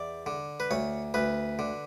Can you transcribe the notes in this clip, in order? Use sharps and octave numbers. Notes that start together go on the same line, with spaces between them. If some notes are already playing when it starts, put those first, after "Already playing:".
Already playing: E2 D5
D3
B4
D2 C#5
D2 B4
D3